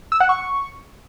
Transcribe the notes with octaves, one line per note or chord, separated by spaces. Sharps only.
E6
F#5
C#6